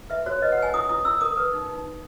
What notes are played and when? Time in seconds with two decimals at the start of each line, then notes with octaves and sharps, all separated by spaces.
0.10 B4 E5
0.26 F#4 C#5
0.42 B4 D#5
0.52 F#5
0.57 B4
0.62 G#5
0.74 E4 D#6
0.89 E4 D#6
1.05 E4 E6
1.21 A#4 D#6
1.37 B4 D#6
1.53 D#4
1.69 D#4
1.85 D#4